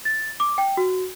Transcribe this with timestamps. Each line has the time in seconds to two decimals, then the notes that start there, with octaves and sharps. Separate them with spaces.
0.05 A6
0.40 D6
0.58 G5
0.77 F#4